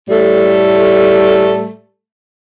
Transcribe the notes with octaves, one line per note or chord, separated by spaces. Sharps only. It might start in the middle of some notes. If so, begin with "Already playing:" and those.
A2 G3 A3 A4